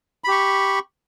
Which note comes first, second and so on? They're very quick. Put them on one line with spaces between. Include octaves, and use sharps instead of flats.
B5 G4 C#6